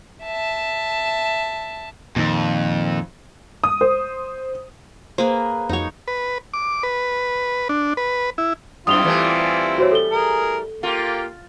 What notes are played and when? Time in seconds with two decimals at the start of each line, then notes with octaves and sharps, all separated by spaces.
0.24 E5 A5
2.16 F2 A#2 D#3
3.64 D#6
3.81 C5
5.18 A#3 G#4 B4 C5
5.69 F2 F#3 D#4 C#5
6.08 B4
6.54 D6
6.83 B4
7.69 D4
7.97 B4
8.38 E4
8.87 F#2 C4 E4 F4 D#6 F7 G7
9.04 E3 G3 A3
9.78 F#4 C5 C#5
9.92 A4 G7
10.11 G#4 A#4
10.83 A#3 F4 G4